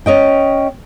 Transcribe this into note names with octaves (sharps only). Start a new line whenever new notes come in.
C#4 D#5 G5